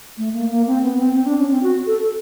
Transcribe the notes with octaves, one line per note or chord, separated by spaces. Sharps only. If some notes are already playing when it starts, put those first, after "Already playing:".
A3
A#3
A#3
C4
B3
C4
C4
D4
C#4
C4
F#4
A4